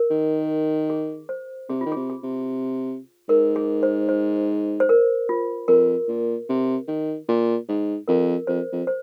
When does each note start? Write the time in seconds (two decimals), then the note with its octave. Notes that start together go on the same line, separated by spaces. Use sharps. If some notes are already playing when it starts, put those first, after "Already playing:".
Already playing: A#4
0.10 D#3
0.90 G#4
1.29 C5
1.69 C3 G#4
1.81 D#3 F4
1.92 C3 G#4
2.10 G#4
2.23 C3
3.29 G#2 A#4
3.56 G#4
3.83 C5
4.09 C5
4.80 C5
4.89 A#4
5.29 F4
5.68 F2 A#4
6.08 A#2
6.49 C3
6.88 D#3
7.28 A#2
7.69 G#2
8.08 F2 A#4
8.47 F2 C5
8.72 F2
8.87 C5